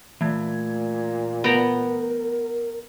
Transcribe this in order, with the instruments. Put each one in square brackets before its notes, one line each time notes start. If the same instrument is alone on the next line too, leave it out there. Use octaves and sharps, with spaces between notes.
[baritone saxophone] A#2 [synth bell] E3 A3 G#6
[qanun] B3 G5 A#5 [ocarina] A#4